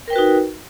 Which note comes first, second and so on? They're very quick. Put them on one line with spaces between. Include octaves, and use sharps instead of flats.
A#4 G5 B4 F#4 D#4